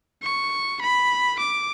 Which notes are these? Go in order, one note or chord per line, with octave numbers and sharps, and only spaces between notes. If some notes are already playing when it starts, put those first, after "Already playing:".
C#6
B5
D6